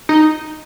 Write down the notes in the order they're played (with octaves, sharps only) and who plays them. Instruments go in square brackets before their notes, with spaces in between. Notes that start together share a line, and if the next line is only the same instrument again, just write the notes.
[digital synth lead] D#4